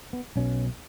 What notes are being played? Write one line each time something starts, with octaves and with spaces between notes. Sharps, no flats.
B3
B1 B2 C#4